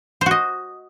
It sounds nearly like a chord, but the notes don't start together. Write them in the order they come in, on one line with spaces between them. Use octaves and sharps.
C5 F#4 D#5